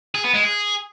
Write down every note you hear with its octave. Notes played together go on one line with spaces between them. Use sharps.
G#4
B3
G#3
G#4